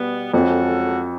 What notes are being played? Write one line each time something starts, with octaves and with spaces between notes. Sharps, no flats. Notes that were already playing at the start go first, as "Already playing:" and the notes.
Already playing: B2 G3 B3
F2 G#3 C#4 F#4 A4